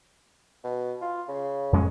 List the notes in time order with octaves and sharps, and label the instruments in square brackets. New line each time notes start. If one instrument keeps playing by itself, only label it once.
[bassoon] B2
F4
C#3
[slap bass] F2 G#3 C#4